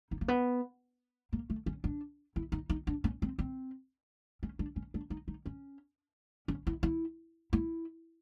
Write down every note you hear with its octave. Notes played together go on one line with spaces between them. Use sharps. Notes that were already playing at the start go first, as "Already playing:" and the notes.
D#4
A#3
B3
A#3
A3
C#4
D4
E4
D#4
D#4
D4
C#4
C4
C4
C#4
D4
C#4
D4
D#4
D#4
C#4
C#4
E4
E4
E4